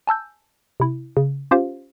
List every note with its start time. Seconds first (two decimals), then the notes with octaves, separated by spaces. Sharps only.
0.07 G#5 A5 E6 G6
0.80 C3 E4
1.17 C#3
1.51 C#4 F4 G4 C5 F5